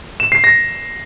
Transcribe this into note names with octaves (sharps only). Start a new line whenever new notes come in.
E7
C7
A#6